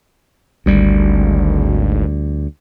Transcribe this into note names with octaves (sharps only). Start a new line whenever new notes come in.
G#1 D2 G3